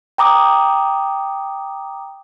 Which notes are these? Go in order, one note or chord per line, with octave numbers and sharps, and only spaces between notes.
G5 A#5 D6 D#6